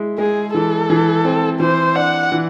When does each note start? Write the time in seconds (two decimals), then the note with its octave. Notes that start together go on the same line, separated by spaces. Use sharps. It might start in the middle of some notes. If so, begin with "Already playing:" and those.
Already playing: G#3 E4
0.18 G#3 G#4
0.54 E3 A4
0.90 E3
1.25 C4
1.60 E3 C5
1.96 D4 F#5
2.32 E3